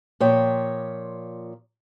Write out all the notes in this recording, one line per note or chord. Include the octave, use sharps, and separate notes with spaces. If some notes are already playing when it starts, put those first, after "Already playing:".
A#2 F3 C#5 G5